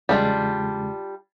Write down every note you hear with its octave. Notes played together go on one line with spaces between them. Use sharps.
E2 C#3 G3 G#3 D4 F4